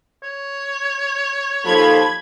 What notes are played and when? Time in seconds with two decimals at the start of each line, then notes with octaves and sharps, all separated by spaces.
0.23 C#5
1.65 D#2 F3 A4 B5 G#6